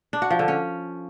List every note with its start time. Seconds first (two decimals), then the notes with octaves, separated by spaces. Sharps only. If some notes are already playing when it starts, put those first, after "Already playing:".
0.13 D4
0.22 F#4
0.30 F3
0.39 D3
0.48 C#4